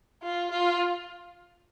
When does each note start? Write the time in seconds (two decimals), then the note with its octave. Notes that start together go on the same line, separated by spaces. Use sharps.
0.23 F4
0.51 F4